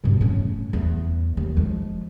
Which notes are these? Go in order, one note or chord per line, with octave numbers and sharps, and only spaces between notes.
G2 B2
A2 C#4
E2
D#2
F3 G#3